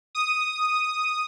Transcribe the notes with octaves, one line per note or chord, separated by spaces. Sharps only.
D#6